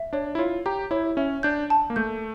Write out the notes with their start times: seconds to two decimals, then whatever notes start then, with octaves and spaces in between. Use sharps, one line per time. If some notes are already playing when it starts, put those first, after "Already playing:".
Already playing: E5
0.13 D4 C#5
0.35 E4
0.39 F4 C#5
0.66 G4 A#5
0.91 E4 C#5
1.17 C#4 E5
1.43 D4 G6
1.70 A5
1.90 A#3
1.96 A3 G6